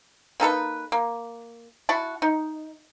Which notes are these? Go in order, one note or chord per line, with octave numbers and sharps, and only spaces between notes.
A#3 D#4 A4 B4
A#3
E4 F#4 A5
D#4